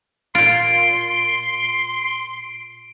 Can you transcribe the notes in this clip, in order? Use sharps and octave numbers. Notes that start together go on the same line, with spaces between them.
A#2 F4 C6 D7